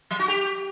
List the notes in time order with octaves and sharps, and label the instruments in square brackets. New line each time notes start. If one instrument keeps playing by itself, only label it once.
[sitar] F#3
F#4
G4